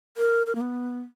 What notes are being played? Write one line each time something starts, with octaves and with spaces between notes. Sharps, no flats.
A#4
A#4
A#3
B3